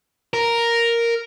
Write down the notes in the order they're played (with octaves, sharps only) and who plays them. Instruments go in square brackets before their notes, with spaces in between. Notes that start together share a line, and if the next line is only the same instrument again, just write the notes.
[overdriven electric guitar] A#4